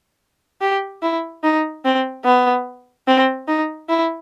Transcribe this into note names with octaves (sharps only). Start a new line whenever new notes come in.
G4
E4
D#4
C4
B3
C4
D#4
E4